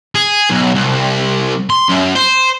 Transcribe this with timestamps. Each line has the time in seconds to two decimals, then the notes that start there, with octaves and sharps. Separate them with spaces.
0.15 G#4
0.51 B1
0.75 C2
1.70 C6
1.89 F#2
2.16 C5